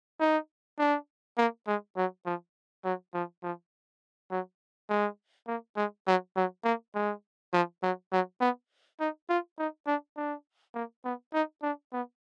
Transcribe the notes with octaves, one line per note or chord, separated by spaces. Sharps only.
D#4
D4
A#3
G#3
F#3
F3
F#3
F3
F3
F#3
G#3
A#3
G#3
F#3
F#3
A#3
G#3
F3
F#3
F#3
B3
D#4
F4
D#4
D4
D4
A#3
B3
D#4
D4
B3